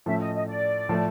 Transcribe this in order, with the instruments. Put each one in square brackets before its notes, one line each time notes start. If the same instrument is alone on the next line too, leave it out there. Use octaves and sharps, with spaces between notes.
[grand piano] A2 F3 A3 C#4 [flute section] E5
[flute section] D#5
D#5
D5
[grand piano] A2 F3 A3